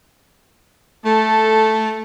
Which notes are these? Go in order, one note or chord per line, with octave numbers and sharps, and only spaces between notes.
A3 A4